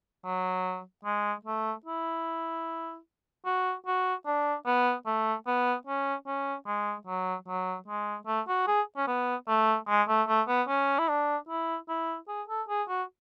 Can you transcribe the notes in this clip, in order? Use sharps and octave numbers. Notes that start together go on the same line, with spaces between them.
F#3
G#3
A3
E4
F#4
F#4
D4
B3
A3
B3
C#4
C#4
G#3
F#3
F#3
G#3
A3
F#4
G#4
C#4
B3
A3
G#3
A3
A3
B3
C#4
E4
D4
E4
E4
G#4
A4
G#4
F#4